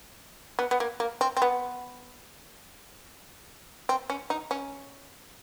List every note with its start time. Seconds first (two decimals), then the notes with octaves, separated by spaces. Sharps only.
0.59 B3
0.71 B3
0.80 A#3
1.00 A#3
1.21 C4
1.37 C4
1.42 B3
3.89 C4
4.10 C#4
4.30 D#4
4.51 C#4